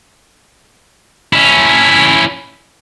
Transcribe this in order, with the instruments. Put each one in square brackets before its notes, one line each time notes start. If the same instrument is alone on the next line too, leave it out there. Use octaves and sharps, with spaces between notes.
[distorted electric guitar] C#4 E4